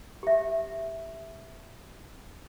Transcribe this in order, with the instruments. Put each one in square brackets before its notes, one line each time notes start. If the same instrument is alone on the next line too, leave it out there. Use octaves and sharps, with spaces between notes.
[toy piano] G4 E5